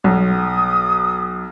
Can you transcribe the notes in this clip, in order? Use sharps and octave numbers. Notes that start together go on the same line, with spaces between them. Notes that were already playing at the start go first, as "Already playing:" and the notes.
B1 D#6